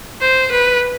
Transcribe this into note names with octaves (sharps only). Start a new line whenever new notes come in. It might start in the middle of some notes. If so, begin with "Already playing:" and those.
C5
B4